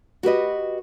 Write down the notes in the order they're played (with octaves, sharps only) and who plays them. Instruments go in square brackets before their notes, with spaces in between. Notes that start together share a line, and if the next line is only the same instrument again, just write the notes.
[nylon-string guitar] F#4 G4 B4 D#5